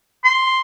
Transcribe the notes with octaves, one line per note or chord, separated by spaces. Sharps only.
C6